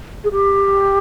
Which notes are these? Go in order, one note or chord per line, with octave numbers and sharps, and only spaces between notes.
G#4
G4